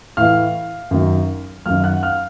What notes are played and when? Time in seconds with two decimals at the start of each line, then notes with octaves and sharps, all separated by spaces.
0.17 A2 E3 F5 F6
0.91 F#2 D#3 F#3
1.66 F#2 D#3 F#3 F5 F6
1.84 F#5 F#6
2.03 F5 F6